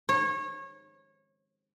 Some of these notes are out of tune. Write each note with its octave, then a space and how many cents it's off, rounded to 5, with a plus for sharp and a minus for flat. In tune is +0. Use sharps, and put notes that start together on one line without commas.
C#5 -25